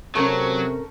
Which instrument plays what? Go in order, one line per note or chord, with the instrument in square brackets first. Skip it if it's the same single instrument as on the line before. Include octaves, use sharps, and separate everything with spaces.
[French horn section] C3 C4 [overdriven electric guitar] F#3 [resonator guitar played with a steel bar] A3 C#4 A#4